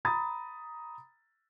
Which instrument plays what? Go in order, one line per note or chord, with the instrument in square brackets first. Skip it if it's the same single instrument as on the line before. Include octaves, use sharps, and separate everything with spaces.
[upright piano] A#5 B5 D#6 A6